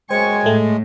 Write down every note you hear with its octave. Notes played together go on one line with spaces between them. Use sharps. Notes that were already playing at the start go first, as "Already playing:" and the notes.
F#2 G#3 C5 G5 G#5 C#6
A2 A3